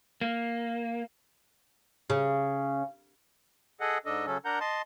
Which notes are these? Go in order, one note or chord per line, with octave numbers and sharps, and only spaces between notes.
A#3
C#3
G#4 A4 D#5 F#5
G#2 D4 A4 D#5
C#3 F#3 C#4 A4
D4 A#4 F#5 A#5 G6
D#5 A5 C6